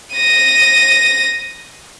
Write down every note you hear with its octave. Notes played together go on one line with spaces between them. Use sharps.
A#6 D#7